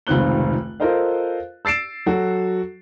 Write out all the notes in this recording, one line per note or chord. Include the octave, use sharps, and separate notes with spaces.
F1 C#2 D#3 C4 F#6 G7
F4 A4 A#4 C5 D#5 F5
E6 A6 C7 D7 E7
F#3 F#4 A4